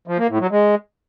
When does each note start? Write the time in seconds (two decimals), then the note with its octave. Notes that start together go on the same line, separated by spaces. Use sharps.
0.07 F3
0.18 A#3
0.29 A2
0.40 F#3
0.51 G#3